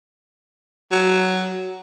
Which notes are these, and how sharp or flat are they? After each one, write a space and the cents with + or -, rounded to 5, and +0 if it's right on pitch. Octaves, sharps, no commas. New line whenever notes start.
F#3 +10